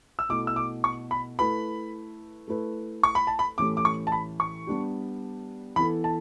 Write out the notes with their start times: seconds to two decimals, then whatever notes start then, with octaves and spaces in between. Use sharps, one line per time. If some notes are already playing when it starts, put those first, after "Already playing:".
0.19 E6
0.29 B2 A3 E4 D6
0.47 E6
0.56 D6
0.84 C#6
1.11 B5
1.39 A3 E4 B4 B5
2.48 A3 E4 B4
3.03 C#6
3.15 B5
3.27 A5
3.39 B5
3.58 A2 E3 A3 C#4 G4 D6
3.77 D6
3.85 C#6
4.07 A5
4.12 B5
4.40 C#6
4.67 G3 B3 D4 G4
5.76 E3 B3 E4 A4 B5
6.04 A5